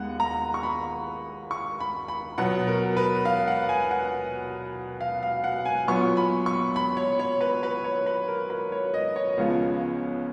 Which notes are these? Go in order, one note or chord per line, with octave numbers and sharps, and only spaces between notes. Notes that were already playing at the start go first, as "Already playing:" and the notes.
Already playing: D#2 G#3 B3 F#5
A#5
C#6
B5
C#6
B5
B5
B2 F#3 B3 F#5
A#4
B4
F5
F#5
G#5
F#5
F5
F5
F#5
G#5
A#2 F#3 B3 C#6
B5
C#6
B5
C#5
C#5
B4
B4
C#5
B4
A#4
B4
C#5
D#5
C#5
C#2 C#3 F3 B3